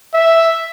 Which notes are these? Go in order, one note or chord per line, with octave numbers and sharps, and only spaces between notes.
E5